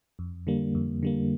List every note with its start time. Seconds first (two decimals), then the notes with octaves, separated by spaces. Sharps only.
0.19 F2
0.47 D3 G3 A#3
0.75 F2
1.03 D3 G3 A#3